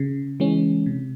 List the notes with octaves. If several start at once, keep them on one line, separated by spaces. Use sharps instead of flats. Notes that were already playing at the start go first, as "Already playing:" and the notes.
Already playing: C#3
E3 G#3 C#4
C3